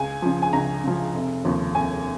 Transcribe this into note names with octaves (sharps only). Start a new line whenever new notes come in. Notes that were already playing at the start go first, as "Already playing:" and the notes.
Already playing: C#2 G#5
C#3 F3
G#5
C#2 A#5
C#3 F3
F1
D#2 C#3 F3
F1 G#5